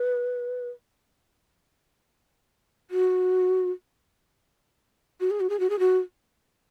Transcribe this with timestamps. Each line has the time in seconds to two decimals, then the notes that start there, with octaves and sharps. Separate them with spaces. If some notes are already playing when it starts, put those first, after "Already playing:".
Already playing: B4
2.91 F#4
5.20 F#4
5.30 G#4
5.40 F#4
5.50 G#4
5.60 F#4
5.70 G#4
5.79 F#4